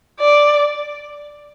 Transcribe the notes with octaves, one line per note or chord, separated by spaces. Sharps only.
D5